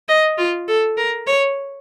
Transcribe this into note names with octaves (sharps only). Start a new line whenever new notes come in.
D#5
F4
A4
A#4
C#5